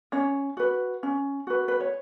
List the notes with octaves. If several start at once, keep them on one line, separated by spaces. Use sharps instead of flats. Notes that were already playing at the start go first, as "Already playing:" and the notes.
C#4 C#5
F#4 B4
C#4
F#4 B4
B4
C#5